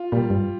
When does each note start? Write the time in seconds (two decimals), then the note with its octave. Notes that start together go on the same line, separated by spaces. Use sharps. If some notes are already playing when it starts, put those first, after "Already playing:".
Already playing: F4
0.12 A#2 G3
0.30 G2